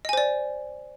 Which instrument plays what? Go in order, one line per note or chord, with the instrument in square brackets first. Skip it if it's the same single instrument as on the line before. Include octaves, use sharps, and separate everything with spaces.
[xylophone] D#5
G#5
C5
D5